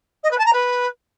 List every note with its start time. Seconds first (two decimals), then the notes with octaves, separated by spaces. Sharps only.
0.23 D#5
0.31 B4
0.38 A5
0.45 A#5
0.53 B4